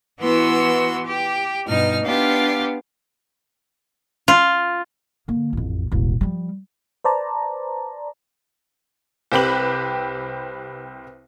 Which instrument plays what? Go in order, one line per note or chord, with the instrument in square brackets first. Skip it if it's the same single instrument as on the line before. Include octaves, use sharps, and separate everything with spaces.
[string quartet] E3 B3 E4 F#4 C6 E6
G4
G2 B2 D#4 F6
B3 D4 F4 G4 F5
[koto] F4
[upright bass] D3 A#3
A1 F2
E1 A1
F3 G3
[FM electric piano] B4 C5 D5 A5 A#5
[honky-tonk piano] C2 C4 G4 B4 F#7